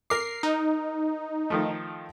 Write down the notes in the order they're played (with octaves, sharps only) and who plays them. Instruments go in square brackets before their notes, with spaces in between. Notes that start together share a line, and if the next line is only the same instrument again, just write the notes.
[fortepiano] A#4 D6 [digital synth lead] C7
[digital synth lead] D#4
[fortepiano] D#3 F3 A3